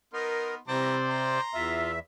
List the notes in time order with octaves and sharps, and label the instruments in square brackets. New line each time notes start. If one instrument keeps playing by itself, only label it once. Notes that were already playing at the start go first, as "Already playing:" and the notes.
[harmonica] B3 D#4 C6 [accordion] A#4
[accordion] C3 [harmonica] E3 G3 A#5 [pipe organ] C5 D5
[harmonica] A#5 C6
[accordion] E2 E5 [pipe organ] F4